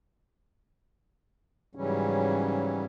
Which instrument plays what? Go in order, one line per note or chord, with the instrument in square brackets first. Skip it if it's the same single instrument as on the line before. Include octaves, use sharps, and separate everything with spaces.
[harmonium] G#2 C#3 E3 F#3 G3 C#4